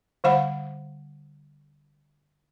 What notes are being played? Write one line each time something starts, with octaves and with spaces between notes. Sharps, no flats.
D3 G3 C5 F5 F#5 B5